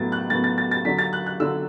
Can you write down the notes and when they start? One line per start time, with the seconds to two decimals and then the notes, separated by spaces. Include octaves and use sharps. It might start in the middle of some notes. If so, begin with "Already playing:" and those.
Already playing: A2 F#3 B3 A6
0.12 F#6
0.30 A2 F#3 B3 A6
0.44 A6
0.58 A6
0.71 A6
0.85 D3 F#3 D4 B6
0.99 A6
1.13 F#6
1.26 F#6
1.40 D3 F#3 D4 E6